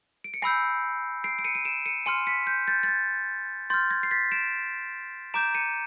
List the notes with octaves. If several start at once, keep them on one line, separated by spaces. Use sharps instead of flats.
D7
C#7
G#5 B5 E6 G6 A#6 C7
C7 D7
D7
C#7 D#7
D#7
D7 E7
C#7 D#7
G#5 C6 F6 C#7 D#7
B6 C#7
G6
G6 A6
A6
G#6
C6 F6 G6 A6
G#6 A#6
C7
A6 B6
D7 E7
A#5 D6 G6 D7 E7
C#7 D#7